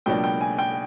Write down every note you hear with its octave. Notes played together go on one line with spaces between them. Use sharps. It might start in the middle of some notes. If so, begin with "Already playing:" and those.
C#2 B2 F#3 A#3 D4 G5
G5
G#5
G5